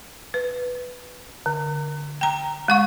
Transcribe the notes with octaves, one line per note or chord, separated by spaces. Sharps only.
B4
D3
G5 A#5
G#3 F#5 C#6